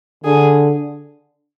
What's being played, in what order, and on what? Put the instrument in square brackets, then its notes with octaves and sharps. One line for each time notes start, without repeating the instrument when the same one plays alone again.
[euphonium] D3 [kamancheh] G#4